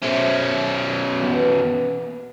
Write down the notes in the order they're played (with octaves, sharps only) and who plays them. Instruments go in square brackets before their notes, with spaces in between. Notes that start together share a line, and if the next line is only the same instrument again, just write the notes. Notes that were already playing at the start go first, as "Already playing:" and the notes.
[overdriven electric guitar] B2 C#4 [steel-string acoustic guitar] A4 C5 E5
[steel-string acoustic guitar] E3 A#3 B3